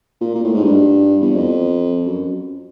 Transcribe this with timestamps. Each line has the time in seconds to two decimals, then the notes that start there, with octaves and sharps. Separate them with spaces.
0.21 A#2
0.35 A#2
0.44 A2
0.54 G#2
0.64 G2
1.21 E2
1.35 F2
2.06 F#2